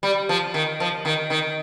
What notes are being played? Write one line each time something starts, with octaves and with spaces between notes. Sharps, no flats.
G3
F3
D#3
F3
D#3
D#3